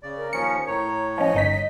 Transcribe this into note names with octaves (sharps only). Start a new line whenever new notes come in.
C#3 D5
A#4
D#2 F3 C#4 C#7
A2 C#5 A#5
F3 C#4 D#5
G1 D#4 B6